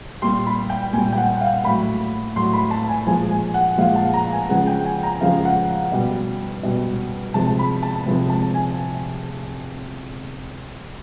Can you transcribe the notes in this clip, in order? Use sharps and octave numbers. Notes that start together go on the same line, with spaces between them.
A#2 G3 C6
B5
G5
A#2 G3 G#5
G5
F#5
F5
A2 F#3 B5
A2 F#3 C6
B5
A5
G#5
A#2 F3 G#3 G#5
G#5
F#5
A#2 F3 G#3 F5
A5
A#5
G#5
C#3 F3 G#3 F#5
G5
G#5
A#5
C#3 F3 G#3 F5
F#5
B2 G3
B2 G3
C3 F3 G#3 A5
B5
A5
C3 F3 G#3
A5
G#5